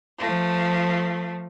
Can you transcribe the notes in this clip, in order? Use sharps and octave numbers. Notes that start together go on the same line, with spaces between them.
F3 A3